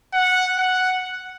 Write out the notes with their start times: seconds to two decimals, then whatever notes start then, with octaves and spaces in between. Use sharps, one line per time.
0.14 F#5
0.58 F#5